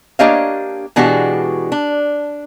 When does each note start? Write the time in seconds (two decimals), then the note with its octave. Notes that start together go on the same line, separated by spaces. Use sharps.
0.19 A#3 D4 G4 C#5 D#5 F5
0.96 B2 E3 G#3 D4 F#4 G4
1.72 D4